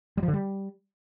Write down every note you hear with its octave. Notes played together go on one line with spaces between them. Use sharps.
G3
F3
D3
G3